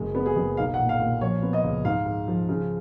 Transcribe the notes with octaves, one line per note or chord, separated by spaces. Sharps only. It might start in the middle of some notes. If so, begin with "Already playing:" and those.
Already playing: F#1 G#3
B3
G#4
F#1
B1 F5
F#5
A#2
F5
A#2
F3 C#5
B3
D#5
C#2
G#2 F5
G#2
F3
C#3